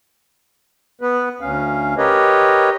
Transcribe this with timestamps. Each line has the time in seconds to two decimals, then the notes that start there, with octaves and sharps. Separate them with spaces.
1.01 B3 B4
1.41 D2 C#4 F5
1.98 G4 A#4 B4 C#5 D#5